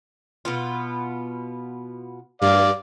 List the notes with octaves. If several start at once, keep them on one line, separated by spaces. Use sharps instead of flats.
B2 B3 F4
G2 D5 F5